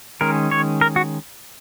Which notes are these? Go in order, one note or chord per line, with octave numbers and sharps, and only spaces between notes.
D#3 G#3 C#4 A#4
C#5
A#4
F#4